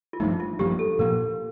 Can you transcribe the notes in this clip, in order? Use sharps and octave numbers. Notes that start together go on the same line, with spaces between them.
F4
G2 F3 A3 D#4
F4
G2 F3 A#3 G4
A4
A#2 F3 A#3 A#4